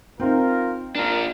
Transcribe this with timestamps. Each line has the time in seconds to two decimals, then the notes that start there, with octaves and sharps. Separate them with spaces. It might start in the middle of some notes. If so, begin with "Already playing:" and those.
0.20 C4 D#4 F4 A#4
0.95 D4 F4 A#4